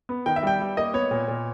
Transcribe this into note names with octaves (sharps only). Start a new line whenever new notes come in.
B3
D#3 G5
E5
G3 G5
G3
A#3 D#5
B3 C#5
A#2
A#2